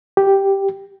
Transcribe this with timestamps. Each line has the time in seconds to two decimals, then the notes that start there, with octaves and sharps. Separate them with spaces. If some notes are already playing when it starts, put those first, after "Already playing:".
0.17 G4